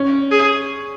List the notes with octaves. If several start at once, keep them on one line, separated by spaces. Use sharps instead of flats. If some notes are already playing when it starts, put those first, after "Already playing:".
Already playing: C#4
G#4